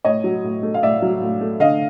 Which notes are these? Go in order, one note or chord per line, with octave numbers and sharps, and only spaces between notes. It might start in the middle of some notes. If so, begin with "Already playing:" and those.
A2 C#5 D#5
F#3
A2
A3
F5
A2 D5 E5
F#3
A2
A3
D3 D#5 F5